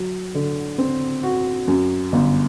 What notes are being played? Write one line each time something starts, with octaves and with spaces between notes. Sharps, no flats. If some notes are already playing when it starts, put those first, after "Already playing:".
Already playing: F#3
D3
C4
F#4
F#2
G1